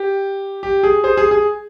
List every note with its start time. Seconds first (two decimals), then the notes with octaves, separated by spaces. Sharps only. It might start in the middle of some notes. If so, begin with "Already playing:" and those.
Already playing: G4
0.63 G4
0.83 G#4
1.04 G#4 C5
1.17 G#4
1.31 G#4